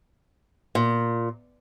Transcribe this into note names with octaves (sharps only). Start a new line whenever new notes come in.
A#2